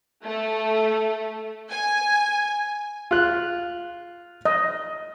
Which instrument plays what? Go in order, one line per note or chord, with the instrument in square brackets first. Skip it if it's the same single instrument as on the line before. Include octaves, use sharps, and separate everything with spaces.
[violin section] A3
G#5
[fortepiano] F4 F#6
[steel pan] D#5